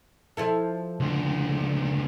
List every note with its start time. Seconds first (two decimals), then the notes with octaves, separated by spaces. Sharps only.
0.37 F3 E4 A4
1.00 C#2 D3